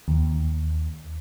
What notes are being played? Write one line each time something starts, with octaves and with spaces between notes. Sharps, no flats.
D#2